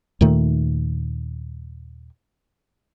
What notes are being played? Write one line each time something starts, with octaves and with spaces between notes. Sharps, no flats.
D#2 A#2 D#3 A3